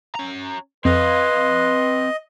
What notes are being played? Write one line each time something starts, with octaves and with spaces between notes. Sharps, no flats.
C#4 A#5
F2 C4 B4 D#5 F5 C6